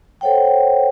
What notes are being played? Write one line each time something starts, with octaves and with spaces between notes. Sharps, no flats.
A4 C5 C#5 F#5 G5